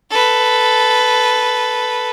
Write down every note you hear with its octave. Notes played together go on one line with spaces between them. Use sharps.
A4 B4